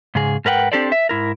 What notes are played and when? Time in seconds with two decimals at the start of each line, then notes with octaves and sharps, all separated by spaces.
0.15 G#2 C#3 G#4
0.45 G#2 A#4 B4 F#5 G5
0.72 C4 D4 G4 A4 C5 D5
0.92 E5
1.09 G#2 E4 A#4